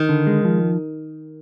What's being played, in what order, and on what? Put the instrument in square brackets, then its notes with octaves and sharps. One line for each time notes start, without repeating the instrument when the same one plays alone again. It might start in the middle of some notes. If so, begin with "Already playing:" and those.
Already playing: [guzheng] D#3
[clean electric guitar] D3
G#3
F3